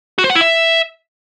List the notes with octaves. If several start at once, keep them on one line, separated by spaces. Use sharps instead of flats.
F#4
C5
F#5
E4
E5